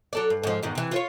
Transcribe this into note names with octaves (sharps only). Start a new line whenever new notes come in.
F#3 A4 D5
G2
G#2 F3
E2 G#2 D#3
C3 E3
F4 C5 C#5